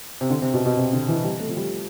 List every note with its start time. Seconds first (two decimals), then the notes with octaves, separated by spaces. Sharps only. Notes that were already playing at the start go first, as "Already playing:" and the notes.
0.21 C3
0.30 D3
0.42 C3
0.54 B2
0.65 B2
0.77 C3
0.93 D3
1.08 E3
1.24 G3
1.40 A3
1.49 F3
1.56 G3